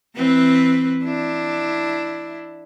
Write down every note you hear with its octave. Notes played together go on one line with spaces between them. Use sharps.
E3 C4 B4
D4 E4